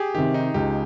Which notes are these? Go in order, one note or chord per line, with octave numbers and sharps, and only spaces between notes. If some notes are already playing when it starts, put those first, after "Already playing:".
Already playing: G4 G#4
C3 D#3 G4
D#4
C#2 G4